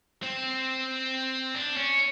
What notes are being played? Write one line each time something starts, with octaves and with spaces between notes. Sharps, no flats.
C4
D4
C#4